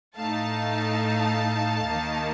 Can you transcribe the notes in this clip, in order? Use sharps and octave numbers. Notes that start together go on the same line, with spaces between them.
A2 A3 D#4 F5 A5
D#2 D#3 A#3 D#4